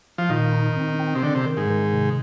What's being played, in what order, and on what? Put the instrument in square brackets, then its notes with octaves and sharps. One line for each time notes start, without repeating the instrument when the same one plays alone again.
[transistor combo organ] F3
[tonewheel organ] A#2 [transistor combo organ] D#3
[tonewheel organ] D#4
C4
C4
[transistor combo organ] C3
[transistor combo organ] D3 [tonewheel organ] D#3
[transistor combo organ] C3
[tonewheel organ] D#3
[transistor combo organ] G#2
[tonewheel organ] D#3
C3